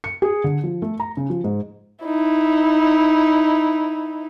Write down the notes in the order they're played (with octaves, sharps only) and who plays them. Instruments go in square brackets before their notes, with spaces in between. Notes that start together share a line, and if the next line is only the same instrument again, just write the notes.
[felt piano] C#7
G#4
D3
F3
A3
A#5
C#3
F3
G#2
[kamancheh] D#4 E4